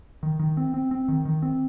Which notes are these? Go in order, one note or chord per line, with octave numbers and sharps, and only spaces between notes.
D#3
D#3
C4
C4
C4
D#3
D#3
C4